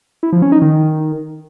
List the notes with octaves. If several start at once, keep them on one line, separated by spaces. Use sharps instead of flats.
E4
F3
C#4
D#4
D#3